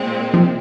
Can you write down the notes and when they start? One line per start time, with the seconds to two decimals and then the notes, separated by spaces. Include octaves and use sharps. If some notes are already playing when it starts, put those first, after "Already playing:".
Already playing: A#2 G#3 C4
0.33 C3 F3